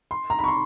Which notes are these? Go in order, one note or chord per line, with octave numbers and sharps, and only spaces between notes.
C6
A#5
B5
C#6
C6